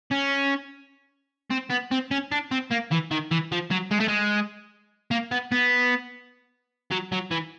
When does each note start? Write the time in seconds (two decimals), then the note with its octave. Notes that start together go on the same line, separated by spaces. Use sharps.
0.11 C#4
1.51 C4
1.70 B3
1.92 C4
2.11 C#4
2.32 D4
2.52 C4
2.71 A#3
2.92 E3
3.11 D#3
3.31 E3
3.52 F3
3.71 F#3
3.91 G#3
4.00 A3
4.08 G#3
5.11 A#3
5.32 B3
5.52 B3
6.91 F#3
7.12 F#3
7.31 E3